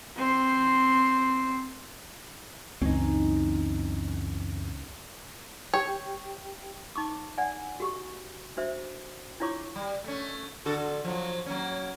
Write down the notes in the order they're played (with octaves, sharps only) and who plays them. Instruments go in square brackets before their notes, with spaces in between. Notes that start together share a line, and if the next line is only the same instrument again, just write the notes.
[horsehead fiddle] C4 C5
[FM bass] C#2 [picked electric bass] F#2 E3 C4 [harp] C#4 D#4
[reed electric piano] G4 G5 [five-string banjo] C#5
[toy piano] D#4 C#6 D6
D5 F#5 G#5
F#4 G4 C#6
D4 F#4 C5 E5
D4 E4 F4 C#5 C#6 D6
[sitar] G3
A3 C#4
D3 F#4 A4
F3 F#3
F#3 A#3 C#4